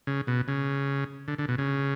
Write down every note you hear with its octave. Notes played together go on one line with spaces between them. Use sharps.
C#3
B2
C#3
D3
D3
B2
C#3